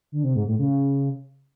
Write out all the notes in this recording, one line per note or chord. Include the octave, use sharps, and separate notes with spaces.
D3
C3
G#2
A2
C#3